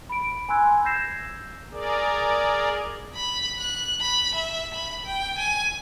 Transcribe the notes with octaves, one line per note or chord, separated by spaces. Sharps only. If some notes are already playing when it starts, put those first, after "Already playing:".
B5 D7
G#5 B5 C6 E6 F#6 G#6
E6 G6 G#6 A#6 C7 E7
G#4 A#4 D5
B5
F#6
B5
E5
B5
G5
G#5